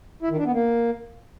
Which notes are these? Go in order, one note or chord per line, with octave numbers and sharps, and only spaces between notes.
E4
D#3
D4
B3
A#3